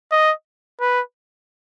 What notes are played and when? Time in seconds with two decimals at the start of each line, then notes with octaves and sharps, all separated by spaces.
0.11 D#5
0.81 B4